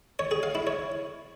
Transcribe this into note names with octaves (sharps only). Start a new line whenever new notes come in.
C#5
G#4
F5
E4
C#5